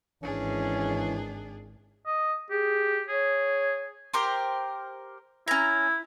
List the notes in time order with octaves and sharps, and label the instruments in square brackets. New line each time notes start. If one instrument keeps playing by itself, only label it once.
[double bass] G#1 [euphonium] E3 [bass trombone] C#4 [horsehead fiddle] D4 G#4
[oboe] D#5
[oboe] G4 [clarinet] G#4
[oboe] G#4 [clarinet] C#5
[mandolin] G4 A#4 C5
[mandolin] C#4 A#5 [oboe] E4